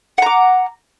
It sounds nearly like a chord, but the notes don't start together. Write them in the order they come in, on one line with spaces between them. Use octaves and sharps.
F#5 A#5 D6